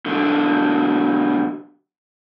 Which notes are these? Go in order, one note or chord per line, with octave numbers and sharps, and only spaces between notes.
B1 D3